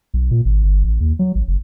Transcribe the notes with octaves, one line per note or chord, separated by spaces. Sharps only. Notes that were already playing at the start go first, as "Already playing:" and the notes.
B1
A#2
G#1
G1
A1
D#2
F#3
A1
F#1